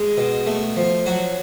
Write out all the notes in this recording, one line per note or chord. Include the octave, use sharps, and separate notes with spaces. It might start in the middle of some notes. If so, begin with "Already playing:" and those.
Already playing: G#3
B2
A3
F3
F#3 F#4